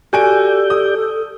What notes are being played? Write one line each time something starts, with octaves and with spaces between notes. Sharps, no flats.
F#4 G4 A4 D5 G#5 G6 D7
D#6